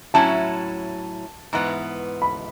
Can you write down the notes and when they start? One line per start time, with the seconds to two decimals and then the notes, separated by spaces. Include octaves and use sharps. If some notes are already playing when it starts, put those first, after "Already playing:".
0.14 A2 F#3 C#4 E4 A5
1.53 G#2 E3 B3
2.22 B5